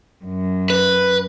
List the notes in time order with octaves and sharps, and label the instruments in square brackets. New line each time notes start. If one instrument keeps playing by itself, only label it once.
[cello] F#2
[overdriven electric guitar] B4